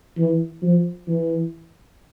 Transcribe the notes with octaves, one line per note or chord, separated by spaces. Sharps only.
E3
F3
E3